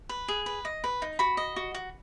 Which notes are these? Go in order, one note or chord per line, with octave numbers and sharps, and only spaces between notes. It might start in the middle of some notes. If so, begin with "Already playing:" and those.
B4
G#4
B4
D#5
B4
D#4
F#4 B5
D#5
F#4
F#4